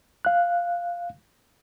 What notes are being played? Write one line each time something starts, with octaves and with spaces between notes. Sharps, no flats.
F5 F#6